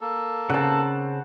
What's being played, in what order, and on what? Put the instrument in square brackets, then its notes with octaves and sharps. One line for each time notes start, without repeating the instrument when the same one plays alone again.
[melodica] A#3 A4
[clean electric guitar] C#3 C4 [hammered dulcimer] F#5 A5